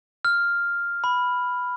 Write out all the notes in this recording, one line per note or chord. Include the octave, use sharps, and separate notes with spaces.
F6
B5